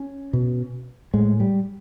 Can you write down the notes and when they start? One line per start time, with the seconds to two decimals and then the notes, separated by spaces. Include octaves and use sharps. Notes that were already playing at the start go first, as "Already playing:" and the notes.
Already playing: C#4
0.33 B2
1.14 A2 G#3
1.40 G3